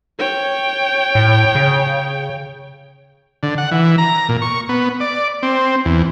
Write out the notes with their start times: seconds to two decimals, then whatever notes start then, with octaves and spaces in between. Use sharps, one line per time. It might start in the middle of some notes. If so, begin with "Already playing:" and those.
0.19 C#5 G5
1.15 A2
1.55 C#3
3.43 D3
3.58 F#5
3.71 E3
3.98 A#5
4.29 A#2
4.42 C#6
4.69 B3
5.00 D5
5.43 C4
5.85 E2